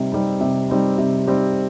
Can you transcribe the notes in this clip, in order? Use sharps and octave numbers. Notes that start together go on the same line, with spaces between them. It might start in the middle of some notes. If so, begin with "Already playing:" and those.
Already playing: C3 G3 C4 D#4
G3 C4 D#4
C3
G3 C4 D#4
C3
G3 C4 D#4